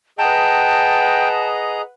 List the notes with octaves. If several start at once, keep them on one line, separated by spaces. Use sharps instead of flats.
G#4 B4 D#5 F#5 G5 A5 A#5